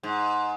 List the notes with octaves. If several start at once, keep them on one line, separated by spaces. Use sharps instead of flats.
G#2